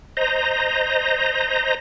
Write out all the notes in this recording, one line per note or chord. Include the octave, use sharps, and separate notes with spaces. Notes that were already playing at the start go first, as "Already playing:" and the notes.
C5 D#5 A#5